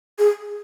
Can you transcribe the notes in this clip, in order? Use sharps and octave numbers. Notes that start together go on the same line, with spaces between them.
G#4